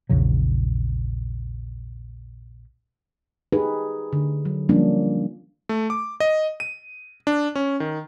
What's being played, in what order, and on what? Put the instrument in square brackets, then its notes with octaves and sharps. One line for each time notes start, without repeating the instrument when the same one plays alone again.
[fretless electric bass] A#1 E2 C#3 F#3
[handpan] D#4 G4 G#4 B4
D3
F#3
F3 G3 A#3 C#4 D4
[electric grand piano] A3
D6
D#5
D#7
D4
C#4
D#3